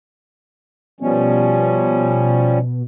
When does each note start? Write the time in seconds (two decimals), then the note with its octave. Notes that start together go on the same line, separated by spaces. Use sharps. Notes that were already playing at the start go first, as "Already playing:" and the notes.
1.00 B2 F3 G3 C#4